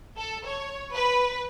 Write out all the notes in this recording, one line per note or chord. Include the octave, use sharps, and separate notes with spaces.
A4
C#5
B4